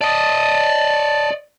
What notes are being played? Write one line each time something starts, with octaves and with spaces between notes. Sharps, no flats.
D5 D#5 A5